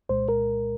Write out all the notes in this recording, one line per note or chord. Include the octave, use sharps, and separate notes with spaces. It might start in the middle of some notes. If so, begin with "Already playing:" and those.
C2 A#2 G#3 C5
A#4